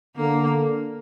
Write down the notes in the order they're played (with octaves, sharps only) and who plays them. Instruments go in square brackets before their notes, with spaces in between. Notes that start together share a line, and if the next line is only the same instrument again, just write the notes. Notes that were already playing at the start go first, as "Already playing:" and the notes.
[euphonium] D3 [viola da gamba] A#3